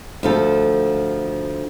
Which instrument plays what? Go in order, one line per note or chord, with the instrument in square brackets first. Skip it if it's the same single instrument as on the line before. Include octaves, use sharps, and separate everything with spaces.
[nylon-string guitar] D2 F3 A4